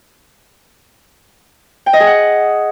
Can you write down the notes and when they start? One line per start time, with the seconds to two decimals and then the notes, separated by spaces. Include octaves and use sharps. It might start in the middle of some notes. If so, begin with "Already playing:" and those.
1.86 G5
1.93 D#5
2.00 G#4
2.07 F#5